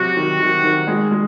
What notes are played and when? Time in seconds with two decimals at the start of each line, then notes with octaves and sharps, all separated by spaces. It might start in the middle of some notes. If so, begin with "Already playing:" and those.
Already playing: C3 F#3 F#4
0.17 D#3
0.41 D#3
0.64 D#3
0.87 G#3
1.11 G#3